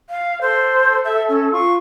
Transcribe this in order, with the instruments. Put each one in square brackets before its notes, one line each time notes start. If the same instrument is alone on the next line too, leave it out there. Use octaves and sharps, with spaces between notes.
[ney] F5
[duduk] A4 [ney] C5
[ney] E5
C#4
[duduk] F4 [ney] C#6